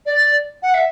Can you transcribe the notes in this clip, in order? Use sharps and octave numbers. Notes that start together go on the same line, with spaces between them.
D5
F#5
E5